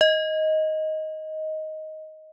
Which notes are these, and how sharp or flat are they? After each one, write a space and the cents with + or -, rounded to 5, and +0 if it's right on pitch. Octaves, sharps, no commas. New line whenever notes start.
D#5 +10